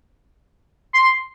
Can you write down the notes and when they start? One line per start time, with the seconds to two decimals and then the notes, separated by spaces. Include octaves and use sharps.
0.94 C6